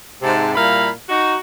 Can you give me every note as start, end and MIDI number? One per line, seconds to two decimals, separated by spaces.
0.22 0.52 44
0.22 0.52 48
0.22 0.52 81
0.55 0.89 46
0.55 0.89 55
0.55 0.89 64
0.55 0.89 77
0.55 0.89 82
0.55 0.89 83
1.09 1.35 63
1.09 1.35 66